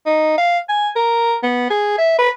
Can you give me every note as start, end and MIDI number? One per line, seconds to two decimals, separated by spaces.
0.06 0.36 63
0.38 0.59 77
0.69 0.88 80
0.96 1.35 70
1.43 1.65 59
1.71 1.98 68
1.98 2.17 76
2.19 2.29 71